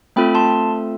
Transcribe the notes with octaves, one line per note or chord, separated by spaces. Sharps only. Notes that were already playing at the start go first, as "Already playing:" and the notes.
A3 C4 F4 A4 G5 B5
A5 C6